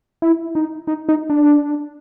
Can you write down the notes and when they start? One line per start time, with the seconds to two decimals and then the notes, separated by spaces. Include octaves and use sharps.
0.22 E4
0.55 D#4
0.87 D#4
1.09 D#4
1.30 D4